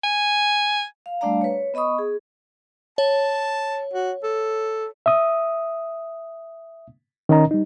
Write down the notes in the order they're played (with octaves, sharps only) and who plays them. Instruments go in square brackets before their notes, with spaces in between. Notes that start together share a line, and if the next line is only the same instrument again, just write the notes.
[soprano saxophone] G#5
[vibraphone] F5
G3 A3 D4 D5 F5 A#5
B4 C#5
B3 D#5 B5 C#6 D#6
G#4
[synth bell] C#5 [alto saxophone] A5
[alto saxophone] F#4
A4
[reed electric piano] E5 D#6
D#3 C#4 A#4 D#5 A#5
G3 D#4